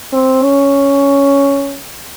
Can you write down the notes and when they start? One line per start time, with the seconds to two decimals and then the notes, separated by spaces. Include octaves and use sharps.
0.12 C4
0.43 C#4